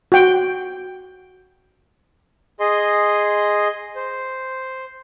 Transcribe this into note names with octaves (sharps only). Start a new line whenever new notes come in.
F#4 G5
G#4 D#5 C6
C5